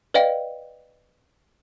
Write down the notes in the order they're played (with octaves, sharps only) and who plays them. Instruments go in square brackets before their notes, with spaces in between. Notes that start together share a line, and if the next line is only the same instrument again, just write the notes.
[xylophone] B4 D5 D#5 F5 G5